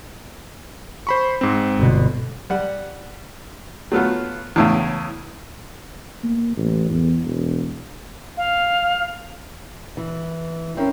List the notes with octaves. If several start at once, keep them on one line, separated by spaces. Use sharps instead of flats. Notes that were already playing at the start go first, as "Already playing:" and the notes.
C5 B5 C#6
G#2 C4
G1 B2
G3 F#5
F#3 A3 B3 F4
E2 A2 C#3
A#3
A1
E2
E1
F5
E3
C4 C#4 E4 A#4